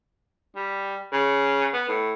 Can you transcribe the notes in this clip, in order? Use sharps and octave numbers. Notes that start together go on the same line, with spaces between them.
G3
C#3
B3
A2